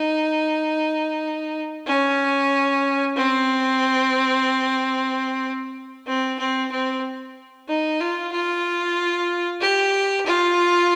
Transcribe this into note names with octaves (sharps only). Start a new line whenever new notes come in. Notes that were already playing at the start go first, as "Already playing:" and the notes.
Already playing: D#4
C#4
C4
C4
C4
C4
D#4
F4
F4
G4
F4